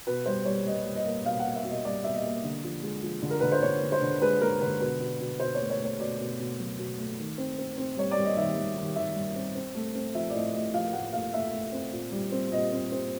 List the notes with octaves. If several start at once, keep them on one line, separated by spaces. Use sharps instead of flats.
B2 B4
G3 C5
G3 C#5
G3 D#5
G3
D#5
A#3
B2 F5
A#3 F#5
E5
B2 D#5
G3 D5
B2 E5
D#5
A#3
D3
F3
G#3
F3
D3
A#4
D3 B4
C5
D3 C#5
D3
C5
D3
G#3 B4
G#3 A#4
D3 B4
B2 B4
B2
B2
B2 C5
C#5
A3
C#5
A3
C#5
B2 D5
B2
B2
F#3
B2
A3
D#3
C4
C4
C4
G3 C#5
D5
G3
D#5
D#3 E5
G3
D#3
D#3 E5
G3
C4
C4
A3
C4
F3 E5
D5
A2 D#5
A3 D#5
F3 F5
A2 F#5
A3 F5
A3 E5
A3
C4
A#2
G3
C4
A#2 D#5
C4
C4